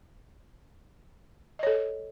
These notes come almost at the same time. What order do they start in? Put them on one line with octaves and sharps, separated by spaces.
D#5 C#5 A4